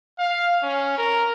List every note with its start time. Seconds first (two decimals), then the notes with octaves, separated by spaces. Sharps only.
0.19 F5
0.63 C#4
0.98 A#4